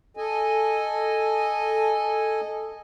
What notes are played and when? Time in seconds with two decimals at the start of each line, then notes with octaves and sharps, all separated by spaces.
0.17 A4 D#5 G#5